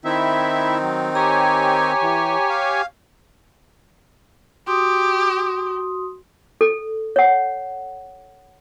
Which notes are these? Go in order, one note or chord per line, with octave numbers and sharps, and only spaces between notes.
D#3 C4 D#4 E4 E5
F#3
G4 C#5 G#5 A#5
E3
F5
F#4 G4 C6 D#6
A4
C#5 F#5